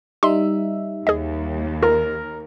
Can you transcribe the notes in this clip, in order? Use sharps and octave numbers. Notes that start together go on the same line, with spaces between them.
G3 D#4 E5 C6
D#2 G#4 D#5
F4 A#4